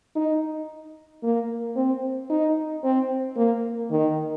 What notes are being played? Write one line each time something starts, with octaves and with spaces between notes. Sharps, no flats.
D#4
A#3
C4
D#4
C4
A#3
D#3